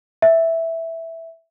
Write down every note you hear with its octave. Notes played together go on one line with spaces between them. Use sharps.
E5